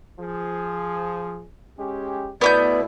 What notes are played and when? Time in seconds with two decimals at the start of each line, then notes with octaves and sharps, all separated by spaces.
0.20 F3 G#4
1.78 G#3 C#4 G4
2.41 B2 A3 B3 E4 D5 D6 G6